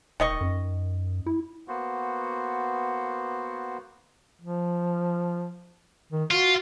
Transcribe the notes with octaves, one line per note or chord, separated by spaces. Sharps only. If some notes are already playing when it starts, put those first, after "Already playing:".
E1 D#3 D#5 C#6
F#2
E4
A#3 B3 F#4 C5
F3
D#3
F4 F#4